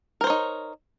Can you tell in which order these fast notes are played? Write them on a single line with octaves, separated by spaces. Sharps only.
A#4 C5 C#5 D#4